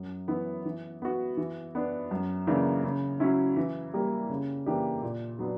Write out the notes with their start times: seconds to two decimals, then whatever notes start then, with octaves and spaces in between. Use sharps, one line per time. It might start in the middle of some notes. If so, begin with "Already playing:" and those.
Already playing: F#2
0.28 E3 B3 E4
0.65 E3
1.02 B3 F#4
1.37 E3
1.75 B3 D4
2.11 F#2
2.47 C#3 E3 A#3 D4
2.84 C#3
3.20 F#3 C#4 E4
3.57 E3
3.94 G3 A#3
4.30 C#3
4.66 E3 A#3 D4 G4
5.02 A#2
5.39 F#3 B3 D4